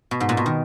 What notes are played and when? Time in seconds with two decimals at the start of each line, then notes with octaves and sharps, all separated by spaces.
0.11 B2
0.20 G#2
0.29 A#2
0.37 B2
0.46 D#3